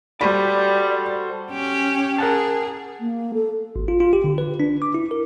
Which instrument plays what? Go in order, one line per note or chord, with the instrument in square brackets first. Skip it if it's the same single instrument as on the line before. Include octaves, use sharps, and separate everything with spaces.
[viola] G3 [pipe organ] F#4 A4 C5 [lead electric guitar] D5 [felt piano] B5
[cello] C#4 G4
[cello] G#4 [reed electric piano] A#4 F#5 A5
[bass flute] A#3
A4
[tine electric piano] G#1
F4
F4
G4
D3
B4
D4
D6
E4
A#4